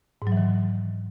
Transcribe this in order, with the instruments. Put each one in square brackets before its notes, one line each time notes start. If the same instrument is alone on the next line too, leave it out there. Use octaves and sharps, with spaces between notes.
[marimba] G#2
F#3
E3
D#3